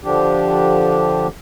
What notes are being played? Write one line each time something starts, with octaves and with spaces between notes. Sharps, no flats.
D3 F3 D4 G4